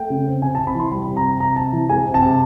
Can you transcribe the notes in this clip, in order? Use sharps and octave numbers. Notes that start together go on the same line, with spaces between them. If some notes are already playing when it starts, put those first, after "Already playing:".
Already playing: A3 G5
C#3
C4
C3 G#5
A5
C3
B5
E3 C6
G3 B5
C3
A#5
C3
C3 A#5
C3 A5
E3
G#3 G#5
C3
A5
C3